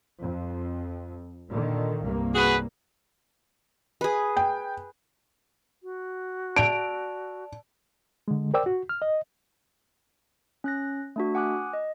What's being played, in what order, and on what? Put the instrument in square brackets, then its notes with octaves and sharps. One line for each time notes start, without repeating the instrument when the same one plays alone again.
[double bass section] F2
A#2 D3 D#3
C2 G2 A#3
[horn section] F#4 G#4 B4
[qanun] G#4 B4
[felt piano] G5
[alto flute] F#4
[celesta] D5 A5 F7 [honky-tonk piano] D7
[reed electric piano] D3 G#3
A#4 C5 D5 G5 D6 E6
F#4
F6
D#5
[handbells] C#4 F#6 A#6
A3 D4 F#4
F#5 G#5 D6 D#6 F#6
D#5